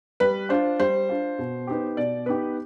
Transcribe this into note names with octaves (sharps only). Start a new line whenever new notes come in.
G3 B4
D4 F4 C5
G3 C5
D4 F4
B2
B3 D#4 G4
B2 D5
B3 D#4 G4 B4